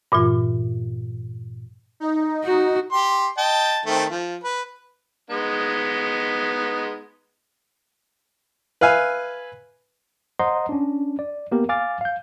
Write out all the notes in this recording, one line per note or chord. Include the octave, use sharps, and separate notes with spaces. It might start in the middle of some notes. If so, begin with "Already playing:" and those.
G2 A#2 E3 F4
D#4
F#4
G4 C6
D#5 G5 A5
D#3 A3 C4
F3
B4
G#3 B3 D#4
B4 E5 F5 G#5
C5 D#5 F#5 A#5 C6
C#4 D4
D5
A#3 B3 G4 A#4
F5 G#5 D6 F6 A6
F5 G6